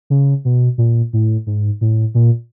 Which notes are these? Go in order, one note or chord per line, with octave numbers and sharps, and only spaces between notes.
C#3
B2
A#2
A2
G#2
A2
A#2